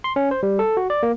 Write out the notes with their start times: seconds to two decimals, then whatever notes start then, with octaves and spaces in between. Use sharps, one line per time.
0.04 C6
0.16 C#4
0.31 C5
0.43 G3
0.59 A4
0.77 F#4
0.90 D5
1.03 A#3